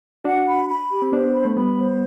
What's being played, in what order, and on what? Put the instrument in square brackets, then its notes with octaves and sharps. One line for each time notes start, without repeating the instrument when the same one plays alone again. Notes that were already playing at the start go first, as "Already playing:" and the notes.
[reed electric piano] D4 F#4 [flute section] F#5
[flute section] B5
B5
G4
[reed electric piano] C4
[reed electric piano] B3 D4 [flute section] C5
[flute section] B5
[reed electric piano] A3
[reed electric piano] G3 B3 [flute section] B5
[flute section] C5